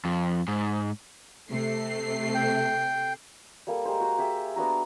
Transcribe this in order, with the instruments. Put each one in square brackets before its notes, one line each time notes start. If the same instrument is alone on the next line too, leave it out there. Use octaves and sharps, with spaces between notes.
[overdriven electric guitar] F2
G#2
[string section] C3 A3 C7
[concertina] G5
[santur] G3 A#3 A4
G#3 G4 A#4 C5
F#4 C5 F#5
G4 G#4 E5
B3 D4 F#4 A#5